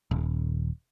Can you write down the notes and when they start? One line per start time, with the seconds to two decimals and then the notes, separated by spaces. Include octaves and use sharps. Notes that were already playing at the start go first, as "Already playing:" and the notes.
0.11 D#1